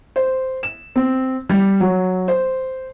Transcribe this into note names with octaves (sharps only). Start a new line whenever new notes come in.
C5
E7
C4
G3
F#3
C5